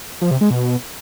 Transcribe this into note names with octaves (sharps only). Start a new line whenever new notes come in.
F3
C3
G#3
B2